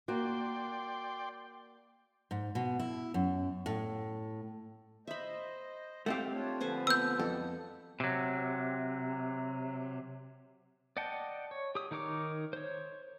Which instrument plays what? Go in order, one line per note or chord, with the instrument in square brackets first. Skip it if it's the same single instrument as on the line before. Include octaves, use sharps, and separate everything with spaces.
[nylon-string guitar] A#3 F#4 [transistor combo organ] D5 G5 C6
[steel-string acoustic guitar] G#2
B2
E4
F#2
A2
[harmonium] C5 D#5 [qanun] E5 B5
[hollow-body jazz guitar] A3 C4 G4 [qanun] F5 F#5
[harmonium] D4 F4 C#5
[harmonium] D3 F3 B4 [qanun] A4 C5 G#5
[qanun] B3 [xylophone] E6 G6
[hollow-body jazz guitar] F2 [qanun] A4
[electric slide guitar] C3 F#3
[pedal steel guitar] D5 D#5 F#5 G5 A5
C#5
G4 D#6
D#3 D#4 A#4 C#5 D6
C5 C#5